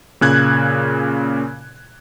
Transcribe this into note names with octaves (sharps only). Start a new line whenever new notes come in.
A#2 C#3 F#6 G#6